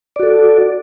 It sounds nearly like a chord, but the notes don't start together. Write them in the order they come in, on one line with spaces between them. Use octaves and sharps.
D5 F#4 A4